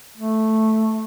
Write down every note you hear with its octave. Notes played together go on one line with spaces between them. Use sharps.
A3